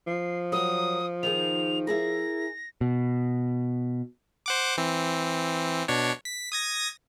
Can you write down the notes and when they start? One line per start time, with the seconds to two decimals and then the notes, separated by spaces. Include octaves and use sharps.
0.07 F3 C7
0.52 F#3 A#4 D#6
1.23 D#3 D#4 G#4 F7
1.87 E4 G#4 A#4 A#6
2.81 B2
4.46 C5 F#5 D6
4.77 E3 C4
5.88 B2 D4 C#5
6.25 B6
6.52 D#6 G#6 A#6